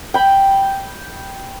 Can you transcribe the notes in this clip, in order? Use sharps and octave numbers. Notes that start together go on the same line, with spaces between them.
G5 B5